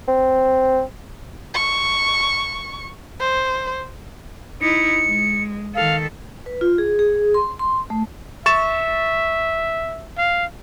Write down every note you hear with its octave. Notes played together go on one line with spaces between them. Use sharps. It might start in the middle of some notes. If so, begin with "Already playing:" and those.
C4
C#6
C5
D#4 E4 C#7
G#3
D#3 A4 F5
B4
F4
G#4
G#4
C6
C6
A3
E5 C#6 A6 E7
F5